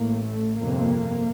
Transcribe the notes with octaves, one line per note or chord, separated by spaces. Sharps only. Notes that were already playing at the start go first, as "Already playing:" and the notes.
Already playing: A1 A2 A#3
A3
G1 F2 C3 A#3